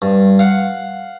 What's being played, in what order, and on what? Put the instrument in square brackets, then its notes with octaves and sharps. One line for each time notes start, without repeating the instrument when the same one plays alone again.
[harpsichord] G2
F5 F#5